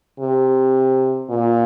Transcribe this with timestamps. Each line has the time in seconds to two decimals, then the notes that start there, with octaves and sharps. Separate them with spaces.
0.20 C3
1.30 A#2